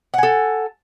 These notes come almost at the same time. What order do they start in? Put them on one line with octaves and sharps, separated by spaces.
F#5 G#5 A4